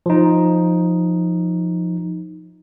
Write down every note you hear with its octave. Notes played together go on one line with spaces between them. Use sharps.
F3 D#4